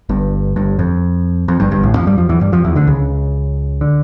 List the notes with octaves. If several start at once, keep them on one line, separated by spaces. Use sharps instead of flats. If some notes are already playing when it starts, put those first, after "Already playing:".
G1 G2
G1 G2
F2
F2
G1 G2
G1 G2
A1 A2
F2 F3
G2 G3
F2 F3
E2 E3
G2 G3
F2 F3
E2 E3
D2 D3
C#2 C#3
D3